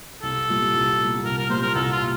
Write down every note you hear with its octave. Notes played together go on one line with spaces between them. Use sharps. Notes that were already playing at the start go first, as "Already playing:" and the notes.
C2 A4
A#2 G3
C2
A#2 G3
C2 A#4
A#4
A#2 G3 C5
A#4
C2 A4
F4
A#2